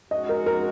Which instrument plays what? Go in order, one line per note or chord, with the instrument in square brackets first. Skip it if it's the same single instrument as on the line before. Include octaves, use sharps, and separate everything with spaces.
[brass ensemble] G#3 C#4 F#4 [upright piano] D#5
[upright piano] A#4
A#4